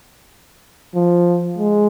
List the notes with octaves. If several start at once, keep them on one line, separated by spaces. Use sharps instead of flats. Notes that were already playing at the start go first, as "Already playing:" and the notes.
F3
G#3